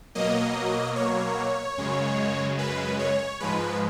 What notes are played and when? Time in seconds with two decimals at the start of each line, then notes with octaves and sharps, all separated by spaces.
0.15 B2 F#3 A#3 D#5
0.96 C#5
1.78 F#2 C#3 G#3
2.59 B4
2.99 C#5
3.40 G#2 F3 G#3 B4